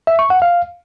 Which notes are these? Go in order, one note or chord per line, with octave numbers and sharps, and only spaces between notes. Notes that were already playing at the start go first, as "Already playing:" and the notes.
E5
C#6
F#5
F5